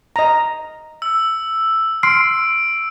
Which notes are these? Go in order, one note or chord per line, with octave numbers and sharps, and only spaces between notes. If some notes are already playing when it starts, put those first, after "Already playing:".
D#5 A#5
E6
C6 F6 C7 D7